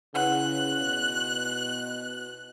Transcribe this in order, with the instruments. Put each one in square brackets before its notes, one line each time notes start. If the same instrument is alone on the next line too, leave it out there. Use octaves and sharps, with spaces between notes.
[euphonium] C#3 [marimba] E4 B4 F#5 [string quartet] F#6
[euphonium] B2